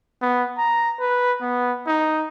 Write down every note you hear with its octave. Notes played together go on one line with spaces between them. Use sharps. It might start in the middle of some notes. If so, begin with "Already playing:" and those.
B3
A#5
B4
B3
D#4